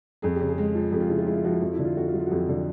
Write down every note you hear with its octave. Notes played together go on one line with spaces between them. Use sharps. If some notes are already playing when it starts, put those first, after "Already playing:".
F2 G#4
C#3 G4
G#4
G#3
F3
F2 G4
F4
C#3 E4
F4
G#3 E4
F4
F3 F#4
E4
F2 F#4
E4
D3
F4
F2 F#4
F4
F#3
F4
F#4
F2 G4
D3